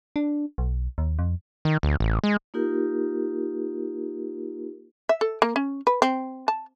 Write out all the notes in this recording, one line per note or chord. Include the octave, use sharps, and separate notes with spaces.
D4
B1
D#2
F2
D#3
D2
A1
G#3
A#3 D#4 F4 G4 A#4
E5
A4
A#3
C#4
B4
C4
A5